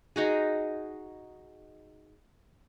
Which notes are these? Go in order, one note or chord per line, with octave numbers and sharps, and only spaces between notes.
D#4 F#4 G#4